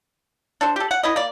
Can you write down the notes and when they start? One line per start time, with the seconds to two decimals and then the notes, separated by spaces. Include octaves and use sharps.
0.61 D4 A4 C5
0.76 G4 A4
0.91 F#5
1.03 E4 B4 D#5
1.16 A#3 D5